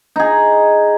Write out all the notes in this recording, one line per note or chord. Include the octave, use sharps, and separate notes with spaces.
D#4 G#4